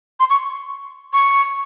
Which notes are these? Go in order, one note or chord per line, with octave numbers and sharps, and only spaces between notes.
C6
C#6
C#6